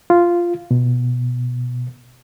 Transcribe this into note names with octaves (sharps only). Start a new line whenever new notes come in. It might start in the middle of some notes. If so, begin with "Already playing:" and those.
F4
B2